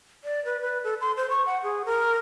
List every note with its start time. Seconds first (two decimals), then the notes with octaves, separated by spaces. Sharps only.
0.24 D5
0.45 B4
0.62 B4
0.84 A4
1.01 C6
1.17 C5
1.30 C#6
1.46 F#5
1.63 G#4
1.85 A#4